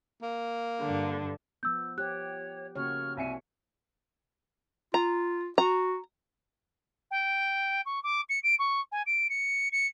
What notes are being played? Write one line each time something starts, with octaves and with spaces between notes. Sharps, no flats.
A#3
G2 D3
F3 B3 E6 G6
G4 C#5 F#6
C#3 A#3 F#4 C#5 F6
C2 E5 G#5 C#7
F4 A#5
F#4 A#5
G5
C#6
D6
C#7
D7
C#6
G#5
D7
C#7
C#7